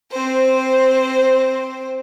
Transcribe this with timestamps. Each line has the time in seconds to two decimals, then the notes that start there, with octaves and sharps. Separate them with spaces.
0.12 C4 C5